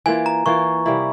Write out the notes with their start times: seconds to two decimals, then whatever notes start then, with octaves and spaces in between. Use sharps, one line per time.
0.06 E3 A#3 F4 G#5
0.26 A#5
0.46 E3 A#3 F4 C#6
0.86 C3 G3 A#3 E4